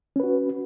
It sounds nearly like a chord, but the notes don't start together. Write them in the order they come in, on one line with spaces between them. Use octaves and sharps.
C#4 B4 F#4